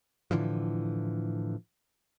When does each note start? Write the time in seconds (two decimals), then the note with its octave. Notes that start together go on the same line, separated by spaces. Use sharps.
0.31 A2 D3 E3 F3